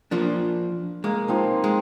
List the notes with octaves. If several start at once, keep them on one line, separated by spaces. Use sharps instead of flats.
F3 A#3 D4
G#3 A#3
F3 C4 D#4
G#3